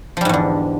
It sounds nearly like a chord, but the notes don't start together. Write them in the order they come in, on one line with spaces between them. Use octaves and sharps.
F3 G3 G#2 E2 D3